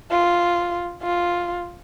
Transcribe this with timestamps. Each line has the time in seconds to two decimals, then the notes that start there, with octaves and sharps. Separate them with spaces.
0.11 F4
1.02 F4